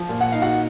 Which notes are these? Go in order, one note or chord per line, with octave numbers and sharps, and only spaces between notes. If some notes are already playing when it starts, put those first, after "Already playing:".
Already playing: F3
A#2
F#5
D#4 F5
F#4 F#5